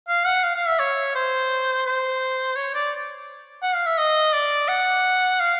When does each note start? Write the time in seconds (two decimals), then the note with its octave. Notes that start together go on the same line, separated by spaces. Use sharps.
0.08 F5
0.26 F#5
0.44 F5
0.56 F5
0.67 E5
0.79 C#5
1.15 C5
1.86 C5
2.56 C#5
2.74 D5
3.62 F#5
3.75 F5
3.86 E5
3.98 D#5
4.33 D5
4.68 F#5
5.40 F5